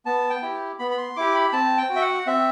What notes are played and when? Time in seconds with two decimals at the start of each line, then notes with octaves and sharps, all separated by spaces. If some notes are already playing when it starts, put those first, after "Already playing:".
0.06 B3 A5
0.30 G5
0.42 E4 G4
0.79 B3 B5
0.91 B5
0.98 C6
1.16 E4 G4 D6
1.35 B5
1.53 C4 A5
1.78 G5
1.90 F#4
1.96 E5
2.01 F#5
2.27 C4 E5